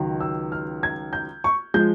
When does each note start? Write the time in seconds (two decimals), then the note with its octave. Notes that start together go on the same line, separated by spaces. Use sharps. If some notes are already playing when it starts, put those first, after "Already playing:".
Already playing: C#2 D#3 F#3
0.20 E6
0.52 F6
0.83 G#6
1.13 G6
1.44 C#6
1.74 F3 G#3 G6